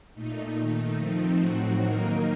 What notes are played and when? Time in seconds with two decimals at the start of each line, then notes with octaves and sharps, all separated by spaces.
0.14 A#2 A3 D#4
0.57 D#3 A3 D#4
0.97 F3 A3 C4 D#4
1.39 A2 F#3 C4 F#4
1.80 D#3 F#3 A#3 D#4 A#4